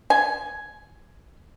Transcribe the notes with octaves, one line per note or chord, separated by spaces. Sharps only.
G#5